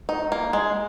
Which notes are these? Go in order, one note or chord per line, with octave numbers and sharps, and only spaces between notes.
D#4
A#3
G#3